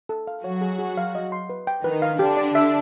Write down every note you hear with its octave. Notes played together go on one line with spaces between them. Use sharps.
A4
F5
F#3 F#4 C#5
G#4
G#4
F5
D#5
C6
B4
G5
D#3 D#4 B4
F5
D3 D4 G4
D5
E5